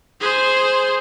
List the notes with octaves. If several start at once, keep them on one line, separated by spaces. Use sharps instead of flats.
G#4 C5